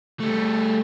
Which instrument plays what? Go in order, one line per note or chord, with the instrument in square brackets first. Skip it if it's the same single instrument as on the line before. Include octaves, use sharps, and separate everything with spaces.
[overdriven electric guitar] G3 A3